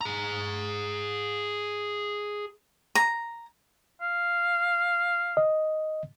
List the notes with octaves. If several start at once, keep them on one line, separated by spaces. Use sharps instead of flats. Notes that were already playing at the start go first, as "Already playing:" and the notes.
G#4 A#5
A#5
F5
D#5